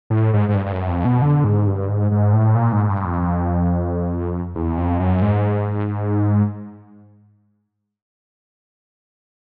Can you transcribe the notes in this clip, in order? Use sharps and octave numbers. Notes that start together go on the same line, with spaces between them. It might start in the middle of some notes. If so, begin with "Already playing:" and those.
A2
G#2
G#2
G2
G2
F#2
F2
B2
D3
G#2
G2
G#2
G#2
A2
A#2
G#2
G2
F2
E2
F2
F#2
G#2